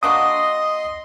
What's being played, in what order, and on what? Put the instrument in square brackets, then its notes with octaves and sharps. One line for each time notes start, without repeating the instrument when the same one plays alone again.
[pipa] A#3 D4 F#4 [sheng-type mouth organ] D#5 C6 [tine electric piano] D#6